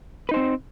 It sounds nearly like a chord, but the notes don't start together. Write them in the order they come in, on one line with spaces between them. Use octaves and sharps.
B4 D#4 C5 C4